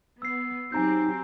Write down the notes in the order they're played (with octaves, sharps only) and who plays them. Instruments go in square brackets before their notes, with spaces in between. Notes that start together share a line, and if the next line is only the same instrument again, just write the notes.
[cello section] B3 [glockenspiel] E6 C7
[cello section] F#3 C4 G4 [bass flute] D#4 [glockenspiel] G#5 A#5 G6